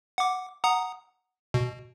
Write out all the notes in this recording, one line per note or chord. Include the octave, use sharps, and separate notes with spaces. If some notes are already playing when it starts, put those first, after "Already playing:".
F#5 D6
F#5 A#5 D#6
B2